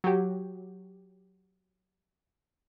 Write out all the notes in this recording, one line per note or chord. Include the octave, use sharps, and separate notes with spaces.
F#3 G4